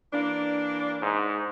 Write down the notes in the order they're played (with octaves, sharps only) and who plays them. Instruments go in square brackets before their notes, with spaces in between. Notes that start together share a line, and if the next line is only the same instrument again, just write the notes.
[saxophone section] E3 A#3 D4
[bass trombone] G#2